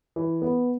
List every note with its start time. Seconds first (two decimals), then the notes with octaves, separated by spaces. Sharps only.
0.16 E3
0.42 B3